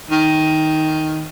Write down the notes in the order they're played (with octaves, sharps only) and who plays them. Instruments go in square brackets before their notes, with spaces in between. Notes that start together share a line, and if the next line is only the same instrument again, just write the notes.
[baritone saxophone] D#3